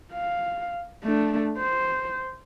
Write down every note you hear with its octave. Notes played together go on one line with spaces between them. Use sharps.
F5
A3 D4
C5